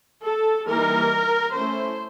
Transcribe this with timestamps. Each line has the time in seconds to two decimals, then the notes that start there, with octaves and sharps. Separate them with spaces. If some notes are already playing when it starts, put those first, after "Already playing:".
0.24 A4
0.68 E3 G3 A#3 D#4 A#4
1.56 A3 C#4 E4 C5